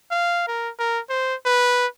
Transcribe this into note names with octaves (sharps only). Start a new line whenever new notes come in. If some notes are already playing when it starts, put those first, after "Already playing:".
F5
A#4
A#4
C5
B4